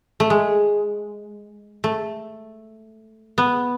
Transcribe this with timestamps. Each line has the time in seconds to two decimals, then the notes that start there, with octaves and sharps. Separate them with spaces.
0.20 A3
0.30 G#3
1.84 A3
3.38 B3